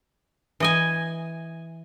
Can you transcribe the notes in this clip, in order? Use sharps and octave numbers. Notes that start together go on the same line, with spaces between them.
E3 D#5 G#5